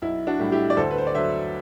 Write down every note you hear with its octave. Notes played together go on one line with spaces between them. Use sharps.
B1 E4
D4 F#4
A2 G3
E4 G4
D5
D2 A4 C5
B4
C5
D5
D3 F#3 C5 E5